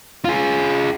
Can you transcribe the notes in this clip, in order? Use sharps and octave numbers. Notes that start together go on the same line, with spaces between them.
F4 G#4